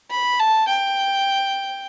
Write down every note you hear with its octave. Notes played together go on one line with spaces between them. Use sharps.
B5
A5
G5